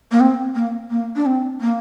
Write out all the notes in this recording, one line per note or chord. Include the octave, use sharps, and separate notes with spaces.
A#3
C4
A#3
A#3
D4
C4
A#3